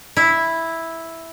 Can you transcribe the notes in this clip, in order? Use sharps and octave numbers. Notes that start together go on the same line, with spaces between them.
E4